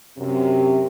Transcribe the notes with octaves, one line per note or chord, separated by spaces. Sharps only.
F#2 C3